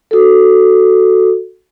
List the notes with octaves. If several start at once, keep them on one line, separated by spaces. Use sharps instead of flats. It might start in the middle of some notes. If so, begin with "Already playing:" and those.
F#4 A4